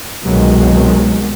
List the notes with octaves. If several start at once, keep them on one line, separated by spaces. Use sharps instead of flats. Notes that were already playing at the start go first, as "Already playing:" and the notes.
C2 B2 D#3 F#3 G#3